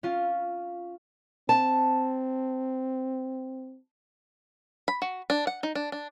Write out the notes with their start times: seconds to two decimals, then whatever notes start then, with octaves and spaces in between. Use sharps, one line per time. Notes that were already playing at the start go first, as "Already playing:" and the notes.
0.03 C#4 F4
1.49 C4 A5
4.88 B5
5.02 F#4
5.30 D4
5.47 F#5
5.63 D#4
5.75 D4
5.92 D4